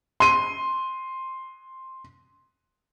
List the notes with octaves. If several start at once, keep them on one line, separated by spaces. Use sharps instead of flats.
C6 D#7